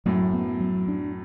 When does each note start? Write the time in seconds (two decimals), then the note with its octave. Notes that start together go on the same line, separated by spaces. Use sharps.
0.06 F#2 A2 F#3
0.33 B3
0.60 F#3
0.88 D4